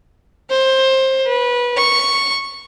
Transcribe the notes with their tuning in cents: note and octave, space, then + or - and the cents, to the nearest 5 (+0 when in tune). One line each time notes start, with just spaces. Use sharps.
C5 +20
B4 -20
C#6 -5